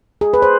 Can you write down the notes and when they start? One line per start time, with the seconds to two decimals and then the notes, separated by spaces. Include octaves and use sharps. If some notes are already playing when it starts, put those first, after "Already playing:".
0.21 G#4
0.34 B4
0.42 C5